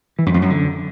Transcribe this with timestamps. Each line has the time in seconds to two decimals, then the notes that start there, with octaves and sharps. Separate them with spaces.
0.19 E3
0.26 F#2
0.34 F2
0.42 F#2
0.50 D3